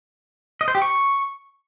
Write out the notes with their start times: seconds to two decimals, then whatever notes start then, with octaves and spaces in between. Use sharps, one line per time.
0.61 D#5
0.68 C5
0.75 G4
0.82 C#6